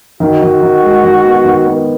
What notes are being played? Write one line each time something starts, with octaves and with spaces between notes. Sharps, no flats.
D#3 F#4
D#3
D#3
G#3
D#3
B3
D#3
B3